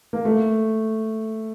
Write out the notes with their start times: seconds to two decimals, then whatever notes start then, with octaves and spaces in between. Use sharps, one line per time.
0.13 A#3
0.25 A3